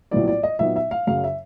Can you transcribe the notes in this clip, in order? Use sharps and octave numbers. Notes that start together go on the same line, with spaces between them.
A#1 A2 F#3 B3 E4 D5
D5
D#5
A#2 F#3 B3 D#4 E5
E5
F5
F#2 C#3 F#3 F5
E5